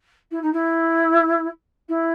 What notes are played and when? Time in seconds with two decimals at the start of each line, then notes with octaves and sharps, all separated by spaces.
0.31 E4
0.42 D#4
0.53 E4
1.88 E4